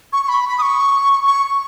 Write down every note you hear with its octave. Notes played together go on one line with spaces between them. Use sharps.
C#6
C#6
B5
B5
D#6
C#6
C#6